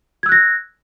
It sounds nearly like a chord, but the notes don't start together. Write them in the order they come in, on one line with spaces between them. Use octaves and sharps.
G#6 E6 F#6 A#6